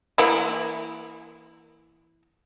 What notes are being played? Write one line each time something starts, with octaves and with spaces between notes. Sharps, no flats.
E3 A#3 E4